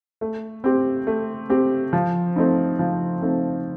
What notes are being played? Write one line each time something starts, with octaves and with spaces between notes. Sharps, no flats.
A3
C4 G4
A3
C4 G4
F3
A3 C4 D#4
F3
A3 C4 D#4